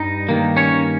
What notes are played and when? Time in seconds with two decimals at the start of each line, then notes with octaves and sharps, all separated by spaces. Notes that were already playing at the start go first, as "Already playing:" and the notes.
Already playing: G2 G3 D#4 D#5
0.29 G2 D#3 A#3
0.56 C#4 C#5